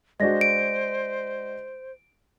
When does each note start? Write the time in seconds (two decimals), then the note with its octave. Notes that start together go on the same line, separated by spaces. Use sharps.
0.20 G#3 D4 F#4 C5 D#5 A#6
0.41 D7